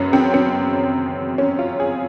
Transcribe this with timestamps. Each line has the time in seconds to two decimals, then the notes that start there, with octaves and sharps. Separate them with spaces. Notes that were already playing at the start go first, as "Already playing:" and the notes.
Already playing: F#2 C#3 F#3 B3 C#4
0.13 C4
0.34 C4
1.38 C#4
1.59 F4
1.80 G#4